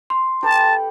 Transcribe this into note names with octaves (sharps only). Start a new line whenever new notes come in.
C6
G4 A4 B4 A5